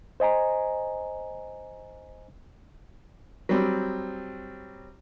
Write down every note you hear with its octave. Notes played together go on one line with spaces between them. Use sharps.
C5 D#5 G#5 A#5
F#3 G3 C4